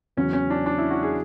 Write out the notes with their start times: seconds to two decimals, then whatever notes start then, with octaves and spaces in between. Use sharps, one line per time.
0.17 E2 C#3 F#3 C#4
0.33 C#4
0.50 D4
0.66 D4
0.78 E4
0.91 F#4
1.03 G#4